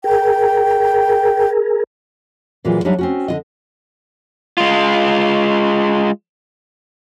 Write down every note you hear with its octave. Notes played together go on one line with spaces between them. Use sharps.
G#4 A#4 G5
A#2 E3 F#3 G#3 F4
F#3 G3 D4 D#4 E5
C4 C#4 F#4
D3 F4 D#5
G#3 F4